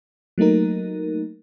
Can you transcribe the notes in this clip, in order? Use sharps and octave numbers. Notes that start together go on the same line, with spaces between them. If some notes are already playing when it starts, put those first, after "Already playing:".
F#3 A3 A#3 D#4 A#4